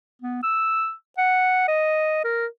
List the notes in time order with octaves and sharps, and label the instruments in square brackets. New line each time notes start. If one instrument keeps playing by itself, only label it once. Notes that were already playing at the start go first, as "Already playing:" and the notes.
[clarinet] B3
E6
F#5
D#5
A#4